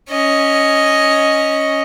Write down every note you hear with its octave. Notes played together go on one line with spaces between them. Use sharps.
C#4 D#5